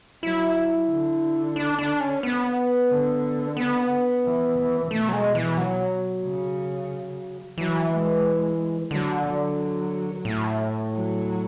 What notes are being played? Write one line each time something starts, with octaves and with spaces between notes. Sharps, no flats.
F#3 E4
D3
D4
D4
C#4
B3
D3
B3
E3
E3
B2 A3
F#3
G#3
E3
F#3
C#3
E3 F#3
G#3
D3 F#3
F#3
A2
F#3